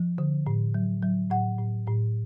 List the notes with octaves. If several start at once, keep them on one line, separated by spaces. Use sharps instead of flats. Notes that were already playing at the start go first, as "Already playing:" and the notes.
Already playing: F3
D3
A2
F#3
F#3
A2 F#5
A2
A2